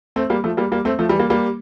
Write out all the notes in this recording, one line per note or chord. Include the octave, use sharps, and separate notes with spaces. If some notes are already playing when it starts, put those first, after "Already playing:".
A3 C4
G3 A#3
F3 A3
G3 A#3
G3 A#3
A3 C4
F3 A3
E3 G3
G3 A#3
G3 A#3